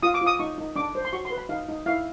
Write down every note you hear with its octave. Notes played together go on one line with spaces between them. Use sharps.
F4 D#6
D6
F4
D#6
D#4 C#6
D#4
D4 D6
C5
C6
F#4 C#6
C6
B4
B5
D#4 F5
D#4
E4 F5